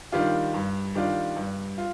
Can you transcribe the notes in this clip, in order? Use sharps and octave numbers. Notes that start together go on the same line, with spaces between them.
D#3 G3 D4 F4
G2
D#3 G3 D4 F4
G2
F4